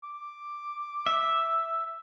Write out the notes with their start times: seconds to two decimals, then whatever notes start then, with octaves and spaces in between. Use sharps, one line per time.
0.04 D6
1.06 E5